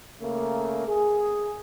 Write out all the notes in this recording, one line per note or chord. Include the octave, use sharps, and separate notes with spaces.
C#3 A3 A#3
G#4